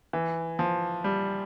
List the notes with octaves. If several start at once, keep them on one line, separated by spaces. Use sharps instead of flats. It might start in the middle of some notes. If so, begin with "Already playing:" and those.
E3
F3
G3